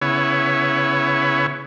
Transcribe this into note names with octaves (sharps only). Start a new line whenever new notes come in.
C#3 B3 E4 C#5